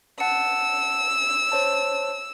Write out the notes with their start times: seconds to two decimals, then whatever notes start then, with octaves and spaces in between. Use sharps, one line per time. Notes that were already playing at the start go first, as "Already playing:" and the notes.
0.20 F#5 A5 E6 C#7
1.52 C5 C#5 A5